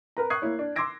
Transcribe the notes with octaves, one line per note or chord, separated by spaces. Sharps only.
A#4 B4 A#5
C#6 D#6 F#6 G#6 C7
A#3 E4 C#5
D4
C6 D6 E6 G#6 A#6 D7